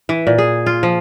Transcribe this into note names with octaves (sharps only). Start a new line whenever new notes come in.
E3
A#2
G#4
F4
F3